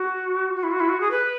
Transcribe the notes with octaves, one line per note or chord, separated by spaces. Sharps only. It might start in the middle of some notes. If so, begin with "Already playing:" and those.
Already playing: F#4
F#4
E4
F#4
E4
F#4
G#4
B4